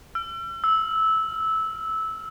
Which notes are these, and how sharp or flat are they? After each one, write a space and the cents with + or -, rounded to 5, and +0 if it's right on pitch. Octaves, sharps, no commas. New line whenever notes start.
E6 +45
E6 -15